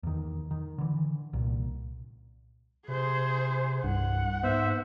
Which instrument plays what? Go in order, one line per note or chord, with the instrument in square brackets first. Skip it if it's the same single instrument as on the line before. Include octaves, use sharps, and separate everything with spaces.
[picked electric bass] E2 D#3
D#3
D3 E3
C2 A#2
[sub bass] C3 [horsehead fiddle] G#4 C5
[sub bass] C2 [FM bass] G2 [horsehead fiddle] F#5
[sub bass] G#2 [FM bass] B3 [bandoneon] C5 E5